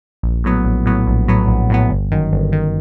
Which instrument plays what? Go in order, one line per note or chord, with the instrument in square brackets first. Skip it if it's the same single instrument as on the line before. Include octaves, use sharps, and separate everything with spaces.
[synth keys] A#1
A2 F#3 B3
A#1
A2 F#3 B3
A#1
A2 F#3 B3
A#1
A2 F#3 B3
G1
F#2 D#3
G1
D#3